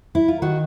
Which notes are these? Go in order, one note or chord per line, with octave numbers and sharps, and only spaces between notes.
E4
F4
D#3 F#4